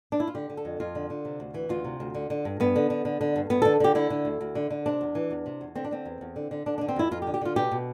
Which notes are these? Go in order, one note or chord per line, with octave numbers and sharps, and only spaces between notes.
D4
E4
F4
D3 G4
D3
A4
F2
F2 F4
D3
D3
C3
D2
E3
D2 F4
C3
D2
D3
D3
G2
G2 B3
D3
D3
D3
D3
G2
G2 B3
D3 A4
D3 G4
D3 E4
D3
D2
D2
D3
D3
C3 D4
E2
E3
E2
C3
E2
D3 C4
D4
D3 C4
E2
E2
D3
D3
D3 D4
D3 D4
C4
F2 E4
F2 F4
G4
D3
G4
D3 F4
B2 G4
B2